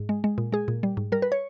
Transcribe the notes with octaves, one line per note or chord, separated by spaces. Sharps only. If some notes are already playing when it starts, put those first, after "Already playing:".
Already playing: G#2
G#3
G#3
A#2
G#3 G#4
A#2
G3
G#2
G3 A#4
B4
C#5